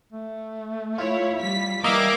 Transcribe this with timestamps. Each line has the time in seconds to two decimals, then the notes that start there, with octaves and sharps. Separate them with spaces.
0.12 A3
0.98 E4 F4 C#5
1.41 G3 B6
1.84 E3 G3 A#3 D#5 E5 A#5 D6 E6